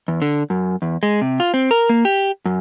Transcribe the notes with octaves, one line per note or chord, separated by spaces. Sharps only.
E2
D3
F#2
E2
G#3
C3
F4
C4
A#4
A#3
G4
F#2